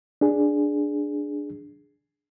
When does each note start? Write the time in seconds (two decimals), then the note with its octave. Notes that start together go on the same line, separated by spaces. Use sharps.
0.21 D4 G#4